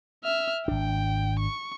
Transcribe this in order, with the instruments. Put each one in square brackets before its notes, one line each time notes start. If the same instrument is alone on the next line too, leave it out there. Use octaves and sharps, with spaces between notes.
[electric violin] E5 F6
[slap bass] G#1 D4 [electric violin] G5
[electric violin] C#6